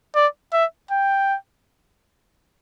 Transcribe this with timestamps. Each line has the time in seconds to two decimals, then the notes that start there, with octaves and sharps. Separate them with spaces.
0.15 D5
0.53 E5
0.91 G5